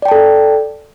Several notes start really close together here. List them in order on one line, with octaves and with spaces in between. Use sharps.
D5 G5 A5 A4